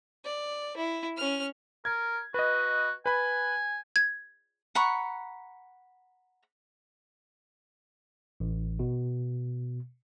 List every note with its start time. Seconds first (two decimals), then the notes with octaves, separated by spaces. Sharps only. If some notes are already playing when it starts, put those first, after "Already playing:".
0.25 D5
0.77 E4
1.17 C#4 F6
1.85 A#4 G#6
2.34 F#4 B4 D#5
3.06 B4 G#5 B5
3.96 G#6
4.75 F#5 A#5 B5 C#6
8.40 A1
8.79 B2